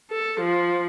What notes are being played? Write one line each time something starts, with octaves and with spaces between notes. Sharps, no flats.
A4
F3